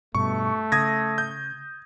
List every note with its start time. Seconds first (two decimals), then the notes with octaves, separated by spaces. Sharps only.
0.15 G2 B2 A3 C#6
0.72 C#3 D#6 G#6 A#6
1.18 G6